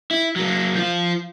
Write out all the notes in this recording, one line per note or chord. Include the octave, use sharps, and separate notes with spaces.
E4
F#3 A#3
F3 F4